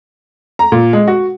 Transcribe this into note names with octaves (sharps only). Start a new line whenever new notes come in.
A#5
A#2
G#3
F#4